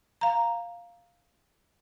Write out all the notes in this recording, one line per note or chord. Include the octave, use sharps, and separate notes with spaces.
F5 A#5